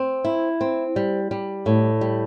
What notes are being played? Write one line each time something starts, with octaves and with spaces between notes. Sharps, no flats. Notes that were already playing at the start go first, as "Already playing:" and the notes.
Already playing: C4
E4
C4
G3
G3
A2
G3